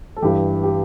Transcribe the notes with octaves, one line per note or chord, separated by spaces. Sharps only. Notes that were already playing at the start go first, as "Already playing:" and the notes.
A4
G2 E3 G4
G4